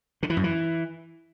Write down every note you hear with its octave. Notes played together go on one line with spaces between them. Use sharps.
D3
E3
F#2
E3